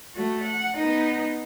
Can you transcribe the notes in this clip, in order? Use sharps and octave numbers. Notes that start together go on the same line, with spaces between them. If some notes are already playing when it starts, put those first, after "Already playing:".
A3 F#4
F#5
B3 D#4